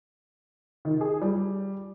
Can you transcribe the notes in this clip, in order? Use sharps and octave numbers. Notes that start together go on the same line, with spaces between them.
D#3
G#4
G3